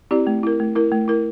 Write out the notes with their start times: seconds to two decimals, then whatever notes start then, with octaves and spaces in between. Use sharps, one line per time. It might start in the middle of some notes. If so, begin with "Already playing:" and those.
0.11 C4 E4 G4 D5
0.27 A3
0.43 E4 A#4
0.60 A3
0.75 E4 A#4
0.92 A3
1.08 E4 A#4